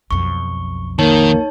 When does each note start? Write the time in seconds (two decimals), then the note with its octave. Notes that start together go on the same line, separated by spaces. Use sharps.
0.11 B1 F2 C#6
0.99 D#3 A#3 D#4 C#5 A5